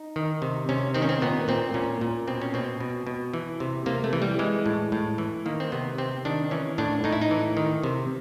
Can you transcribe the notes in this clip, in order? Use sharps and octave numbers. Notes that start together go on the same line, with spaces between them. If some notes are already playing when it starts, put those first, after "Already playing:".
Already playing: D#4
D#3
C3
C3 C#4
D#3 C4
C#4
C4
A#2 B3
A#2 C4
A#2 C#4
A#2
B2 C4
C#4
B2 C4
B2
B2
E3
C3
C3 A#3
A3
E3
G3
E3 G#3
A2
A2
E3
D#3 A#3
C4
C3 B3
C3 C4
D#3 D4
E3 C#4
A2 D4
A2 D#4
E4
D#4
E3
D#3
C3